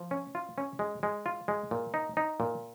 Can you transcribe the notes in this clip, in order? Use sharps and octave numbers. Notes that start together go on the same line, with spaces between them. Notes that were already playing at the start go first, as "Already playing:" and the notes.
Already playing: F3
C#4
F4
C#4
G#3
G#3
F4
G#3
A#2
D#4
D#4
A#2